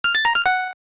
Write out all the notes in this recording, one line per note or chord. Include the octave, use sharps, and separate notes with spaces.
F6
A6
A#5
F6
F#5